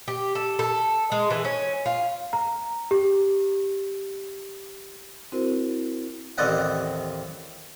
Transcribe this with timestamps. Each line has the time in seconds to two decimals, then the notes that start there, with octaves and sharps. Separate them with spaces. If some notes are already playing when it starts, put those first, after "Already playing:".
0.08 G4
0.35 A4
0.59 A4
1.12 G#3
1.30 E3
1.45 C#4
1.86 F4
2.33 A#5
2.91 G4
5.32 C4 E4 F#4 A#4 C5
6.38 A1 D#2 C4 D5 D#5 F#5